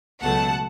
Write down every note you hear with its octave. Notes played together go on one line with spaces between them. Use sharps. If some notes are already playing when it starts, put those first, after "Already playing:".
C#2 B2 F#3 A3 F#5 A5